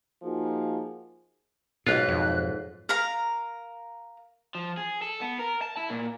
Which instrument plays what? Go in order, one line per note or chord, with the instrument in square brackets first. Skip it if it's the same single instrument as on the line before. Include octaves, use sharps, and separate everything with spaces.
[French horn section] F3 A#3 D#4 F4 F#4 G#4
[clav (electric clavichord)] B1 F4 [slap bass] G#2 [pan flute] F#6
[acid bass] F2
[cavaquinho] A#4 F5 A#5
[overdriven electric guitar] F3
G#4
A4
B3
A#4
A5
E4
A#2